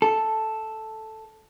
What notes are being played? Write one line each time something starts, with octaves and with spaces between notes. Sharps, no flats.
A4